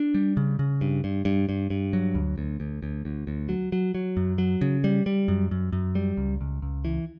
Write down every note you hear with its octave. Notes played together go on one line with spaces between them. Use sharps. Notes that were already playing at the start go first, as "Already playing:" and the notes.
Already playing: D4
G3
C#3
C#3
G2
G2
G2
G2
G2
F#3
D2
D2
D2
D2
D2
D2
F#3
F#3
F#3
F#2
F#3
C#3
G3
G3
F#2
F#2
F#2
G3
C#2
C#2
C#2
E3